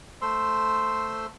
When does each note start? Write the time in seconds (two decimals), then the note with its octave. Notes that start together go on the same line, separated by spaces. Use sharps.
0.22 A3 C5 C6 E6